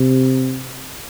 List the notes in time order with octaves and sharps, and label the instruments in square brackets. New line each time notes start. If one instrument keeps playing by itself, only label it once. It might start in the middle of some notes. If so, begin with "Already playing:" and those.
Already playing: [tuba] C3